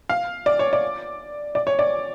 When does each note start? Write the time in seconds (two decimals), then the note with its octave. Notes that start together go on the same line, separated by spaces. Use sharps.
0.09 F5
0.46 D5
0.59 C#5
0.73 D5
1.55 D5
1.67 C#5
1.79 D5